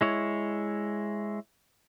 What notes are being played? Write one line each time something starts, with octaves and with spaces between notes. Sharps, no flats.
G#3 E4 C#5